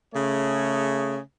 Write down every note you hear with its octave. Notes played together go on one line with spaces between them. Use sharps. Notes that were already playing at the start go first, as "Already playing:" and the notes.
C#3 A3 G#4 C#5